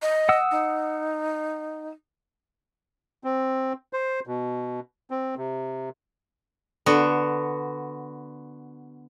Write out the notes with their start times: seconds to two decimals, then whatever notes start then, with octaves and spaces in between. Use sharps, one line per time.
0.02 D#5
0.29 F#5 D#6 E6
0.51 D#4
3.24 C4
3.93 C5
4.27 B2
5.10 C4
5.37 C3
6.86 D3 B3 F#4